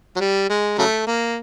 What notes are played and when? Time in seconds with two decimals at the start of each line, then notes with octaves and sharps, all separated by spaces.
0.16 F#3
0.20 G3
0.49 G#3
0.78 C#3 F#3 A3
1.07 A#3